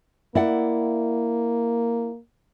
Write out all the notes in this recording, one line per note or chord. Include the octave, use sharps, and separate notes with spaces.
A#3 E4 D5 F#5